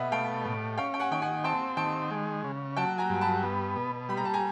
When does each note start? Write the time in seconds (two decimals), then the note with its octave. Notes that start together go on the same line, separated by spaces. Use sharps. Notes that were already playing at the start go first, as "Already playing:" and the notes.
Already playing: B2 D#5 E5 F#5
0.12 A3 F5 G5
0.45 A2
0.78 C#4 F5 G5
0.94 G5
1.00 F#5 G#5
1.11 D#3 G5
1.22 F#5 G#5
1.44 C4 G5 A5
1.77 D#3 G5 A5
2.11 G#3
2.44 C#3
2.77 F#3 G5 A5
2.98 G#5 A#5
3.09 G2
3.21 A5 B5
3.43 B3
3.76 B2
4.09 G3 B5
4.17 A#5
4.25 A5
4.34 G#5 A#5